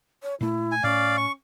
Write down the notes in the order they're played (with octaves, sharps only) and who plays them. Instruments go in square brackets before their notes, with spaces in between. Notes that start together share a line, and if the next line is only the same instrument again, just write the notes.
[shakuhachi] C#5
[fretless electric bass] A#2 A3 [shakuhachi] E4
[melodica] G#5
[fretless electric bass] A2 [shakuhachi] C#4 [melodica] D5 F5
[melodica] C#6